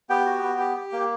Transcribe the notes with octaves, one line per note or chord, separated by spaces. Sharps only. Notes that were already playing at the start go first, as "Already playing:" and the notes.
B3 G4 G5
F#4
B3
G4
G4
A#3